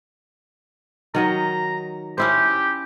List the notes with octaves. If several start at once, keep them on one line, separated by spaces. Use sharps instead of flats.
D#3 F#3 D#5 A#5
C#4 E4 G4 C5